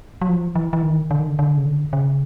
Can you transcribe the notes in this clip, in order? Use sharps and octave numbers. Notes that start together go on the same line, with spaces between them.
F#3
F3
E3
E3
D#3
D3
D#3
D3
D3
C#3
D3
C#3